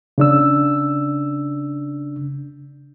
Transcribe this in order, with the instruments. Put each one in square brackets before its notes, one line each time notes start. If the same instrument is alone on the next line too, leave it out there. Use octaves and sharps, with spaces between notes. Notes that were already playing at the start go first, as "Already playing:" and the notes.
[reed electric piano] C#3 D4 E6